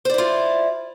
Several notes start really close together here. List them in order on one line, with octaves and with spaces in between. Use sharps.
C5 D5 E4 F4